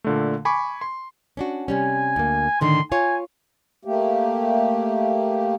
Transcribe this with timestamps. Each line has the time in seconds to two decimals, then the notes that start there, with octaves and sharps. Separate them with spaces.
0.04 A#2 D3 A3
0.45 G#5 B5 C#6 D6
0.81 C6
1.37 C#4 D4 F#4
1.68 C3 G3 C#4 G#5
2.16 D2 A#3
2.61 A2 D3 D#3 C6
2.92 F4 C#5 G#5
3.85 A3 A#3 G4